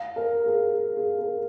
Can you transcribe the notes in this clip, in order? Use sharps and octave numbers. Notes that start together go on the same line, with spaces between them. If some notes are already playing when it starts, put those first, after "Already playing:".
Already playing: F5
A#4
G#4
G#4
A#4